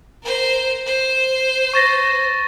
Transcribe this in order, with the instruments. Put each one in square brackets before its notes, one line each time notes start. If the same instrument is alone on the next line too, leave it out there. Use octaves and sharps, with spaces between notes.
[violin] A#4 C5
C5
[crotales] C#6 A6 A#6